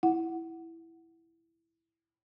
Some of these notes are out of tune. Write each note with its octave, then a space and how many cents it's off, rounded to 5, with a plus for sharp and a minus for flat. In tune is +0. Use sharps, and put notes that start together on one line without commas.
E4 +0 F#5 +0